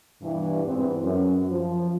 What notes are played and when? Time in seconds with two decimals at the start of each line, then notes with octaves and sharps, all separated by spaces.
0.22 G2 B2 E3
0.64 E2 G#2 B2 E3 B3 C4
1.02 F#2
1.50 F3